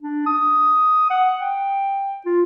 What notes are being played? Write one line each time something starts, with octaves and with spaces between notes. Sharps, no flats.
D4
D#6
F#5
G5
F4